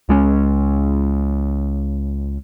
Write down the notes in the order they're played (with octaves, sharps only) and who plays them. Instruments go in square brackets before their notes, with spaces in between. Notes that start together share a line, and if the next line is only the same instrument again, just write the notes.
[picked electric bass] C#2 G#3 C#4